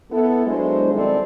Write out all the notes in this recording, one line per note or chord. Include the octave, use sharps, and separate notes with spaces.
B3 E4 A4
F#3 G#3 D4 E4 C5
D#3 G3 C4 E4 A4 D5